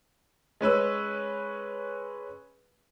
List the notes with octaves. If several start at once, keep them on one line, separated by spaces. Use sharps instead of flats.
G#3 C#4 B4 E6